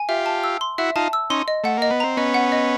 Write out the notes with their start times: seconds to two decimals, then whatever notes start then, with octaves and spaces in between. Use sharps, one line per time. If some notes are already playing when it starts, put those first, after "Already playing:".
Already playing: G#5
0.09 F4 G4 E5
0.26 A5
0.44 E6
0.61 C6
0.78 E4 F#4 E5
0.96 D#4 F4 A5
1.13 E6
1.30 C#4 D#4 C6
1.48 D#5
1.64 A3 F#5
1.77 A#3 D#5
1.90 B3
2.00 C4 A#5
2.17 B3 C#4 D#5
2.34 F#5
2.52 D#5